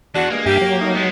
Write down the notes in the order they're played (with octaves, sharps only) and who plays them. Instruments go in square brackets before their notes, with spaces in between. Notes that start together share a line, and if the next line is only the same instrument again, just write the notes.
[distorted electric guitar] E2 [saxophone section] D4 F#4
[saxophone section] G2 G#3 [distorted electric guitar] A#3
[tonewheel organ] G2 E5 G#5 [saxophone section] G4
[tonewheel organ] F#3
[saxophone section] G3 A3 D#4
[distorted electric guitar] G#3 B3